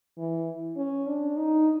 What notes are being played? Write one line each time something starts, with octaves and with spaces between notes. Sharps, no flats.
E3
C#4
D4
D#4